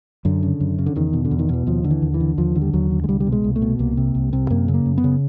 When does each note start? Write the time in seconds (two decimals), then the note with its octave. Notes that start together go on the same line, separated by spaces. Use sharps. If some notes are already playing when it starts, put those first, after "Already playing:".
0.25 F#2 D3
0.43 C#3
0.60 F#2
0.78 C#3
0.86 D3
0.96 E2 D#3
1.13 B2
1.25 D3
1.31 E2
1.39 D#3
1.49 B2 E3
1.67 D#2 F3
1.84 D3
1.91 E3
2.02 D#2
2.14 E3
2.20 D3
2.38 D#2 F3
2.55 D3
2.62 G3
2.73 D#2 F#3
2.91 D3
3.04 G#3
3.09 C2 G3
3.20 G3
3.27 B2
3.32 G#3
3.44 C2
3.56 A3
3.62 B2
3.79 C2 A#3
3.97 C3
4.15 C2
4.33 C3
4.50 F#2 A#3
4.68 C#3
4.74 A#3
4.86 F#2
4.98 B3
5.04 C#3